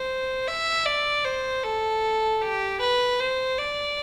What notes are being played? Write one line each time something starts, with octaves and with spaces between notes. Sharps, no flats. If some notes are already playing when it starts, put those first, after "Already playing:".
Already playing: C5
E5
D5
C5
A4
G4
B4
C5
D5